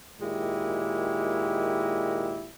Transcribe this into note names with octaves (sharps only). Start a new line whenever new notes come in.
A#2 D#3 G#3 E4 G4